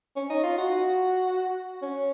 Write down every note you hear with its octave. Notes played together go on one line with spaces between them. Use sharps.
C#4
D#4
F4
F#4
C#4